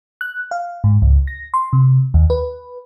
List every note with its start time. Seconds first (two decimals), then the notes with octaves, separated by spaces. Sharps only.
0.21 F#6
0.51 F5
0.84 G#2
1.02 C#2
1.27 A#6
1.54 C6
1.73 C3
2.14 D#2
2.30 B4